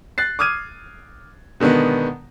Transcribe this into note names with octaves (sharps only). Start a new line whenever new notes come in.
F#6 A6 C7
D6 D#6 F6 G#6 D#7
B2 D3 D#3 G#3 B3